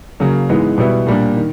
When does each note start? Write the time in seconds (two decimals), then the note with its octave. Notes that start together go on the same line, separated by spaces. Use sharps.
0.20 C#3 F#3 A#3
0.49 G#2 E3 G#3 B3
0.78 B2 G3 B3 E4
1.07 A#2 G3 A#3 D4
1.37 D#3